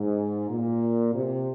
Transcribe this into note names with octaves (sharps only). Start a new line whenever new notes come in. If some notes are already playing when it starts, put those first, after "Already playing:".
Already playing: G#2
A#2
C3